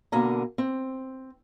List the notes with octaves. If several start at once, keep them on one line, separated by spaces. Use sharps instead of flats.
B2 D3 A#3 G#5 A#5
C4